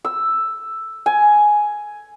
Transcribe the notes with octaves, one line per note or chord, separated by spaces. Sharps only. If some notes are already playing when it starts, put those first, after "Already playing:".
E6
G#5